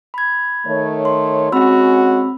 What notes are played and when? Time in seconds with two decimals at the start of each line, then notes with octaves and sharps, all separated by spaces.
0.14 B5 G#6
0.66 D#3 A3 C#5
1.05 C6
1.52 G#3 C4 C#4 F#4 B5 E6